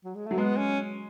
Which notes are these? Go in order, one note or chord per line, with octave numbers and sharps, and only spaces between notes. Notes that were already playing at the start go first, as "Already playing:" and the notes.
F#3
G#3
F#3 A3
G#3 B3
C#4